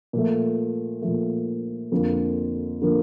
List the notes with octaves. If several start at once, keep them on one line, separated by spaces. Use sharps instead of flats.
A#2 F3 A3
A#2 F3 A3
F2 D3 F3 A#3
D3 F3 A#3